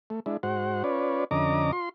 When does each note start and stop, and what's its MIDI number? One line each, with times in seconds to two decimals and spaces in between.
0.10 0.20 57
0.26 0.37 56
0.26 0.37 62
0.26 0.37 64
0.43 0.83 44
0.43 0.83 66
0.43 0.83 72
0.43 0.83 78
0.84 1.24 61
0.84 1.24 65
0.84 1.24 71
0.84 1.24 73
0.84 1.24 74
1.31 1.71 41
1.31 1.71 50
1.31 1.71 61
1.31 1.71 75
1.31 1.71 82
1.31 1.71 86
1.72 1.89 65
1.72 1.89 84